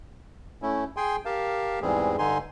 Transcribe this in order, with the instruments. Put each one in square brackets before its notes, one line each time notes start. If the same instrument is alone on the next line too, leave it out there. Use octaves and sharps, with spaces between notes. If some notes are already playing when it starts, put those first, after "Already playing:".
[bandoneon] A3 C#4 E4
G#4 G5 G#5 C6
G4 A#4 F5 A5
E2 G#2 E3 G3 C4 G#4
G2 D3 D#4 G#5 C6